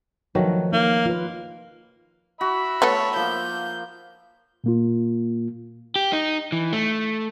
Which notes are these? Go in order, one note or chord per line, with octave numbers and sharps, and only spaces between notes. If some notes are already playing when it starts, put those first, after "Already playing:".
D#3 F3 F#3 A3 B4
A#3 D#4
F4 B4
F#4 E5 B5
A3 B3 A4 C#5
F3 A#3 G6
A#2 A#3 F4
G4
D#4
E3
A3